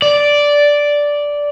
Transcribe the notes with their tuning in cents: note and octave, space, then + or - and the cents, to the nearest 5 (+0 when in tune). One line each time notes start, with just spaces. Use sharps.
D5 -5